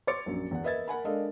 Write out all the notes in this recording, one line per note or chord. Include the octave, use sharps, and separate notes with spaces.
C#5 C6 D6 A6 C#7
A#1 F#2
E2 F#5
A#4 B4 D#5 E5 G#6 A6
A#4 F#5 G#5 B5
G#3 D4 A4 A#4 D#5 F5